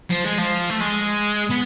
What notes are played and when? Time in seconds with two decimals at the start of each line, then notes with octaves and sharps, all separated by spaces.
0.11 F3
0.25 G#3
0.38 F3
0.70 A3
0.80 G#3
1.50 B3